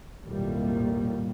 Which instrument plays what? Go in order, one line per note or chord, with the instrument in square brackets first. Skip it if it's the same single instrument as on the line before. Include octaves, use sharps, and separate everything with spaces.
[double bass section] B1 F2 A2 D#3 G3 A#3